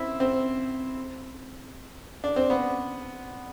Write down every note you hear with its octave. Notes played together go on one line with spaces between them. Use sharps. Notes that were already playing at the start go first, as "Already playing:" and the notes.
Already playing: C4 E4
C4
D4
C4
B3